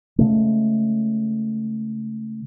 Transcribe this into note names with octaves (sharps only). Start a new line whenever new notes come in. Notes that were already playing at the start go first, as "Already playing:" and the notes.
C#3 G#3 A3